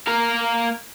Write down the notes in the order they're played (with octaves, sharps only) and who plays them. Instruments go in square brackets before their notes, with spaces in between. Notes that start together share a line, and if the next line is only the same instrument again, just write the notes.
[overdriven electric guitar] A#3 A#4